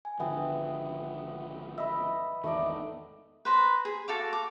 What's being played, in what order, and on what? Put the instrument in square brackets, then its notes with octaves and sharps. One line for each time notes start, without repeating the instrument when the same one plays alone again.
[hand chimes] G#5
[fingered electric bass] G#1 D3 F3 [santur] B3 [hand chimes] E5 G5
[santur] D#5 E5 [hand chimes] B5 E6
[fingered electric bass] G#1 E2 D#3 [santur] A3 D#4 D5
[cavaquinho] B4 C5 A#5
G#4
F#4 A4 F5 D6
D6